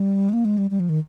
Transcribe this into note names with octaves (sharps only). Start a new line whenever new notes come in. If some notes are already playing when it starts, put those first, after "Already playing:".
Already playing: G3
G#3
A#3
G#3
G3
G3
F3
D#3